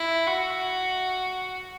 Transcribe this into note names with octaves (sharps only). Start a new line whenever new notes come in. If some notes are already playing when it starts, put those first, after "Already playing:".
Already playing: E4
F#4